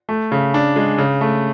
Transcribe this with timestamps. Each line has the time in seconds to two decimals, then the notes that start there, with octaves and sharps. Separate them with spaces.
0.09 A3
0.32 C#3
0.54 D4
0.76 G#3
0.98 C#3
1.21 A3